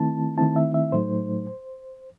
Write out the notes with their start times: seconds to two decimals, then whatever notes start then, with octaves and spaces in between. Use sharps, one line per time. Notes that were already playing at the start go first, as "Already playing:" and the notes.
Already playing: D#3 A3 C4 E4 A5
0.37 D#3 A3 C4 E4 A5
0.56 E5
0.74 E5
0.92 A2 F#3 A3 D#4 C5